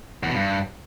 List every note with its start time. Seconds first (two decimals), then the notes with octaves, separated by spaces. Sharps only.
0.23 E2
0.29 B2
0.35 G2